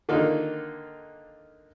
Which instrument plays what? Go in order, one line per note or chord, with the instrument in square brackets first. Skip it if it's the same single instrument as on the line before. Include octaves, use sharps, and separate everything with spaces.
[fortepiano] D3 D#3 A#3 D#4 F4